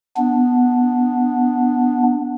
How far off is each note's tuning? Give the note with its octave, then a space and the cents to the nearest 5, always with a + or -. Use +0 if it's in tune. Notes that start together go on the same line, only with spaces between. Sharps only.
B3 +0 D4 +0